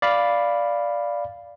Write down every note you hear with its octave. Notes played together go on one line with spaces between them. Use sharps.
D5 F5 B5